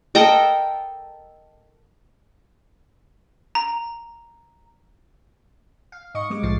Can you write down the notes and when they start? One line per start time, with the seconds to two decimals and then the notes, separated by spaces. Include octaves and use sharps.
0.15 A4 A#4 D#5 G5
3.55 A#5
5.92 F5
6.14 G#2 D#5 C#6
6.30 G3 G#3 D6
6.43 B1 A2 F3 A6 C7